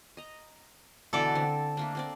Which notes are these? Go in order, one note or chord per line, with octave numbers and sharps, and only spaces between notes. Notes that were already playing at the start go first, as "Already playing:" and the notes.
D#5 A#5
B2 D3 E3 A4 D5
D3 C4
A3 A#3 D4
A#3 C4 D5